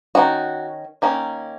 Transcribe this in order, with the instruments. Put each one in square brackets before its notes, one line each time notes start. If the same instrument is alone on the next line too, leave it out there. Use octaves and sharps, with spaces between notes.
[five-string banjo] D#3 F#3 C#4 F#4
D#3 A#3 C#4